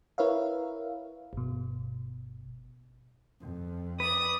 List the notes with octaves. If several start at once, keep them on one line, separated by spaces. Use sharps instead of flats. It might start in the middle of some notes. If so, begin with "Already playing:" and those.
E4 A#4 B4 C#5 E5 F5
G1 B2
F2
B4 D5 D#6